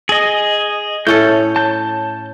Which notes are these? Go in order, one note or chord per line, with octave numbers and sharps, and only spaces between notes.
G#4 D#5
A2 C#4 A4 G6
A5 G6